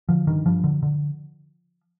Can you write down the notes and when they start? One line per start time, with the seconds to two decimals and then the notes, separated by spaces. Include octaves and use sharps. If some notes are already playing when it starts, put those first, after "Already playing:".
0.09 D3 F3
0.27 G2 D#3
0.46 G2 F3
0.64 D3
0.83 D3